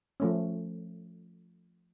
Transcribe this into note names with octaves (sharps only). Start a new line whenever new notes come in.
F3 A3 C#4